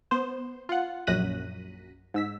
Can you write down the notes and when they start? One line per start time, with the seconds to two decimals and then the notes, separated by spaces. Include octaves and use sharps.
0.11 B3 C5
0.69 F4 F#5
1.07 A#1 F#2 F#6 A#6 B6 D#7
2.14 G#2 E6 B6